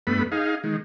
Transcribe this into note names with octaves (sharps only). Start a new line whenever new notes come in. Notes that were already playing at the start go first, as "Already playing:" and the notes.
G2 A3 B3 B5
D#4 G#4 F5
D#3 G#3